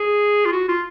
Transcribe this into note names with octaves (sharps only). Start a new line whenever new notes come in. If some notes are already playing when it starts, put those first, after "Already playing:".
Already playing: G#4
F4
F#4
F4